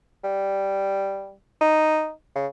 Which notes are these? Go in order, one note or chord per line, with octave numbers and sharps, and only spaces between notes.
G3
D#4
C#3